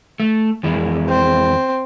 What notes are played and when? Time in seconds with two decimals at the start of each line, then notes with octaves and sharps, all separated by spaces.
0.20 A3
0.63 F2 E3 G#3
1.08 C4